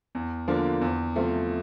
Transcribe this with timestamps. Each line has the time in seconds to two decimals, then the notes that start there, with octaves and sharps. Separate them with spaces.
0.15 E2
0.48 D3 F3 A#3 D4
0.81 E2
1.16 C3 F3 A3